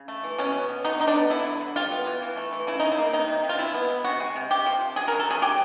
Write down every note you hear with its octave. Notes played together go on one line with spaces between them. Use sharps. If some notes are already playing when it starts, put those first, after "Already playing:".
Already playing: C#3
A3
E3
B2 C#4
B3
B2
D3 D#4
D3 D#4
D4
B3
D3 E4
F#3
D3
G3 F4
B3
E3
E3
A3
E3
C#3 E4
C#3 D#4
E4
A#3
C3 D#4
C3
C3
F4
G#3 E4
B3
B2
C3 F#4
G#3
C3
C3 G4
F3
F3
F#3 G#4
A#4
F#3
A4
A3 G#4
F#3 G4